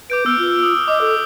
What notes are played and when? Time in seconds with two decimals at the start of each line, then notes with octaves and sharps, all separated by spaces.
0.10 B4 D6 G6 D7
0.26 B3 E6 F6 D7
0.39 F4
0.63 D#6
0.88 D#5 D6
1.01 A4